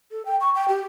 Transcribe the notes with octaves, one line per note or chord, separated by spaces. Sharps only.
A4
G5
C#6
G5
G4